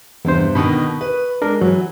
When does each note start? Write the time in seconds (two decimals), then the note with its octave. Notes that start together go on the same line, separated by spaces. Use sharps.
0.25 E2 G2 C3 C5
0.55 B2 D3 D#3 B5 C#6 D#6
1.01 B4
1.42 G#3 D4 A#4
1.61 E3 F#3